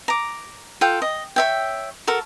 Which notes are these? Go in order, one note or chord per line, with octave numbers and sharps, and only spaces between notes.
A#5 D6
F4 A4 G5
D#5
C#5 E5 G5
F#4 A4 A#4